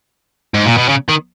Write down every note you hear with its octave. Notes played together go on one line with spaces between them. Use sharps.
G#2
A#2
B2
C#3
D#3